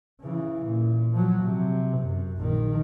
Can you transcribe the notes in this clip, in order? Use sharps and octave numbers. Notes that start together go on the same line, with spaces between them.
C#3 E3
A#2
F3 F#3
C3
F#2
A#1 D#3